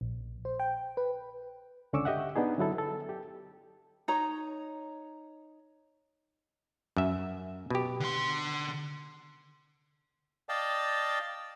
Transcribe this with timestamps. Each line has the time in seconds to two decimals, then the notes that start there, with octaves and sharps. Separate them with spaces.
0.01 A#1
0.45 C5
0.59 G5
0.97 B4
1.93 C#2 D3 C#4 C#6 D6 E6
2.05 G4 D#5 E5 F#5
2.36 B3 D4 D#4 G#4
2.58 D3 F#3 E4 A4
2.78 A4
3.09 G4
4.08 D#4 C#5 A#5
6.97 F#2 E5
7.70 B2 G4
8.00 D3 C6
10.49 D5 D#5 F5 G5 A5